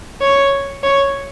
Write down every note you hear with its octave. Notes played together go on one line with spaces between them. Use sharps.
C#5
C#5